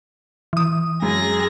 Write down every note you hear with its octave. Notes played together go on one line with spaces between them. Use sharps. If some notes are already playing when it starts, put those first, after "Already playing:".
E3 D#6
F#2 G#4 A#6